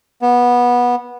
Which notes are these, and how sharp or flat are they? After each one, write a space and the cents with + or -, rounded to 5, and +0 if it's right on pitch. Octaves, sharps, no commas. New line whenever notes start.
B3 -15